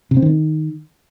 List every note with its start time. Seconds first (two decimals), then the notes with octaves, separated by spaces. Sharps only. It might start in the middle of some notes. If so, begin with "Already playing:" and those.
0.11 C3
0.17 C4
0.22 D#3